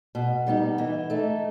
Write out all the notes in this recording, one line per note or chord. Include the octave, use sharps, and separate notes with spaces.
B2
G3 B3 D#4
E3
A3 D#4